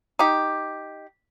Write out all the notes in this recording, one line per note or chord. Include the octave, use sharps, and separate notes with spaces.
D#4 G4